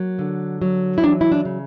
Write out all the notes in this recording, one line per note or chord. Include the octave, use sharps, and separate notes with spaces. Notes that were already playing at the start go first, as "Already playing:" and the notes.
Already playing: F#3 A#3
D3
F#3
E4
E3 D4
E4
D4
C#3